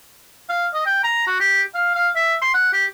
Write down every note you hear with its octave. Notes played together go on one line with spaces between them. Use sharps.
F5
D#5
G5
A#5
F#4
G4
F5
F5
E5
C6
F#5
G4